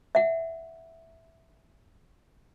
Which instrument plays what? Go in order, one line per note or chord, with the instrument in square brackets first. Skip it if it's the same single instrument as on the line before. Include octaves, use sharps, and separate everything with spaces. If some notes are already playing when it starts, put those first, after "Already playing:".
[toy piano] E5 F#5